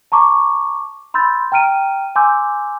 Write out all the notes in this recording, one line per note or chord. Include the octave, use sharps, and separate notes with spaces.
A5 A#5 C#6 D6
B5 C6 E6 G6 A6
G5 A#5 F6 D7 D#7
G#5 C6 D6 E6 G6